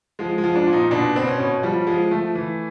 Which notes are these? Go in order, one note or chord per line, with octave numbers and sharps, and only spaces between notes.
F3 G#3
G#3
F3
D4
A#2
D#4
B2 D4
B2 C4
C#4
B2
F3 G3
F3 G#3
F3 A3
E3